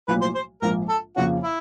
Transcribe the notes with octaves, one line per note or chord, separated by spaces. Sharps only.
B1 A2 F3 A#3 B4
C5
C5
A#1 G#2 F3 A#3 A#4
A4
F2 C#3 F3 A#3 C#4 F#4
E4